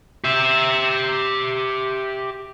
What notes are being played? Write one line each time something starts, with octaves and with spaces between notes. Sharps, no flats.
G4 E5